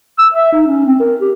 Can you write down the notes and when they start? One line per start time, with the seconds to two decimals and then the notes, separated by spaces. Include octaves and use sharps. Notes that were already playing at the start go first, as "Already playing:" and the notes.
0.19 E6
0.34 E5
0.52 D#4
0.67 C#4
0.85 C4
1.00 A#4
1.21 G4